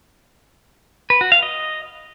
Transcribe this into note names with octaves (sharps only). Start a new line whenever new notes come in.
B4
F#4
F5
D#5